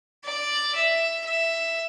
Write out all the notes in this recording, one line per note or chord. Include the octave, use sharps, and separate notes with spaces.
D5
E5
E5